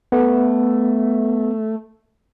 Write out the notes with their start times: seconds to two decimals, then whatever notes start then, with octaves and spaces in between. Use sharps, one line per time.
0.12 A3 B3